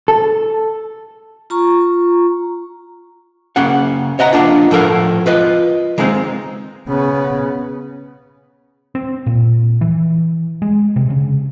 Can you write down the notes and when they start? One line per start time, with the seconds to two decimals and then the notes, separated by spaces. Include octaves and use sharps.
0.08 A4
1.50 F4 A#5 C#6
3.56 C#3 A#3 C#4 F5 F#5
4.19 C#5 D#5 F#5 A#5
4.33 A#3 B3 C#4 D4 F4
4.71 A2 F3 A4 A#4 F5 F#5
5.26 F4 B4 D#5
5.98 D#3 G#3 A#3 C4 D#4
6.89 C#3 B3
8.95 C4
9.26 A#2
9.81 E3
10.62 G#3
10.96 C3
11.10 C#3